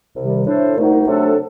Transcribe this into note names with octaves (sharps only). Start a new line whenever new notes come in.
C2 C3 D#3 G3
A2 A3 D4 A4 C5
C2 A#2 A3 D#4 F#4
C3 F#3 A3 D4 A4